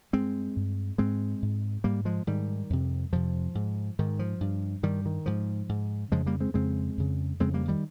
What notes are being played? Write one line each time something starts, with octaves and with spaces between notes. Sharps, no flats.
G2 G#3 C4
G2
G#2 G#3 C4
G#2
G#2 G3 A#3
F3 G#3
G#2 D#3 G3
F2 C3
F2 C3 F3
G#2
G#2 D#3
F3
G2
G2 D#3 G3
D#3
G#2 F3
G#2
F2 C#3 F3 G#3
G3 A#3
G#3 C4
F2 C#3 G#3 C4
F2 C#3
F2 C#3 G#3 C4
G3 A#3
D#3 G3